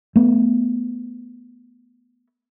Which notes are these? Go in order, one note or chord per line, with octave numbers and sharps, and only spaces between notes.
A3 B3